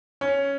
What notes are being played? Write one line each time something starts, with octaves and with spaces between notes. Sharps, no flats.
C#4